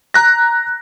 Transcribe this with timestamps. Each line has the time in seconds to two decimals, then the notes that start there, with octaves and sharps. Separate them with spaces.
0.14 A#5 F#6 A#6